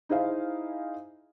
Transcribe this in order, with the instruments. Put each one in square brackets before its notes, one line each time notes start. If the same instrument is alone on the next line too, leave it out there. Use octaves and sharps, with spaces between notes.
[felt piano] D#4 E4 G#4 C5 F5 G#5